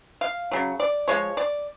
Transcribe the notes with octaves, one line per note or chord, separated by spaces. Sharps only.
F5
C#3 F#3
D5
F3 G#3 C#5
D5